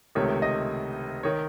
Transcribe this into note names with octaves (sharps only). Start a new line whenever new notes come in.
C#2 C3 D#3 A3 C#5
D#5
D#3 C#5